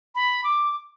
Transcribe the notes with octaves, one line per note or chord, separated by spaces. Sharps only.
B5
D6